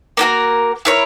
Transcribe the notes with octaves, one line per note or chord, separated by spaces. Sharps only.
A#3 D4 F#4 A#4
E4 A#4 C#5